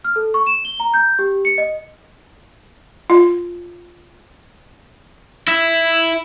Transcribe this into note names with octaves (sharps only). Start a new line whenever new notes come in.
F6
A4
C#6
E7
G7
A#5
G6
G4
C#7
D#5
F4
E4 E5